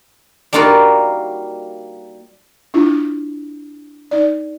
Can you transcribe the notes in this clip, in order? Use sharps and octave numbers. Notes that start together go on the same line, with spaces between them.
G3 A#3 D#4 F4 F#4 D5
D4 E4 F4
D#4 D5